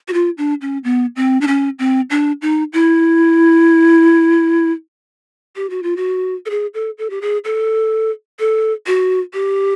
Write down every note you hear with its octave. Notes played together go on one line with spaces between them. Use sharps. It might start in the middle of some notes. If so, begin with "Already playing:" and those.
F#4
F4
D4
C#4
B3
C4
D4
C#4
C4
D4
D#4
E4
G4
F#4
F4
F#4
A4
G#4
A4
A4
G4
G#4
A4
A4
F#4
G4